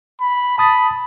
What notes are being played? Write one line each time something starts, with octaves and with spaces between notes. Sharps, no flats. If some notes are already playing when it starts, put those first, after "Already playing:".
B5
A5 B5 D#6 A6